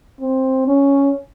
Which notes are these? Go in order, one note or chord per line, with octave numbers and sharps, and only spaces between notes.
C4
C#4